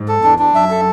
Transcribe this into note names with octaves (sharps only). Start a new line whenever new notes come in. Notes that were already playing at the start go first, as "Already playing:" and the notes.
Already playing: G#2
A4
E2 D4
D4
F#2 E5
A4